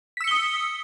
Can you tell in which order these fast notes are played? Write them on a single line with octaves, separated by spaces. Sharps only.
B6 E6 C#7 G7 D#6